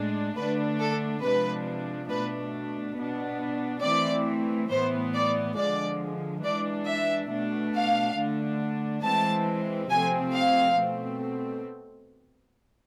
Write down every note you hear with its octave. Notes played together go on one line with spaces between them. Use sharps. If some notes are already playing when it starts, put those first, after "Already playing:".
Already playing: A2 G#3 D4
D3 A3 D4 B4
A4
C3 F3 G#3 D4 B4
B2 A3 D4 B4
B2 B3 D4
E3 A3 C4 D5
A2 E3 B3 C5
D5
D3 F3 G#3 D5
E3 G#3 D4 D5
E5
B2 A3 D4
F5
D3 A3 D4
E3 G#3 C4 A5
C3 F3 A3 C4 G#5
F5
B2 A3 C4